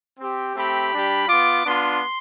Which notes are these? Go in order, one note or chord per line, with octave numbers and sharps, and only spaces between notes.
C4 G4
A3 C4 G4 B5
G3 D4 G4
B3 F4 D6
B3 D4 F4 C6